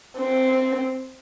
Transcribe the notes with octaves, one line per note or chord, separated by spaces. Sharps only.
C4